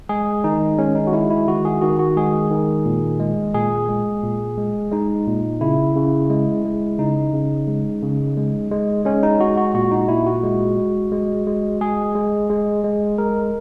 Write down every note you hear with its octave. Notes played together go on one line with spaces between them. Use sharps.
G#3 G#4
D#3 D#4
G#3 C#4
D#4
F#4
G#3 E4
E4
D#3 F#4
G#4
D#3 F#4
F#4
G#3 G#4
D#3
A#2
G#3
A#2 G#4
G#3
A#2
G#3
G#3 D#4
A#2
C#3 E4
C#3
G#3
G#3
C#3 D#4
C#3
G#3
C#3
G#3
G#3
G#3 C#4
D#4
G#3 F#4
F#4
A#2 F#4
D#4
A#2 E4
F#4
G#3
G#3
G#3
G#3
G#3 G#4
G#3
G#3
G#3
G#3 A#4